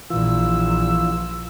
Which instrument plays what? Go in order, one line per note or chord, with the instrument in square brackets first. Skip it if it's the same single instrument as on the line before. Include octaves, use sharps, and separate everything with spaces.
[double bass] A#1 A#2 [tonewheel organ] E3 F4 [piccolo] E6